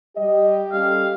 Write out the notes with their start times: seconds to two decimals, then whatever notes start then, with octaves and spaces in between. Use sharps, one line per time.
0.17 G3 G4 D#5
0.73 G3 C#4 A4 F5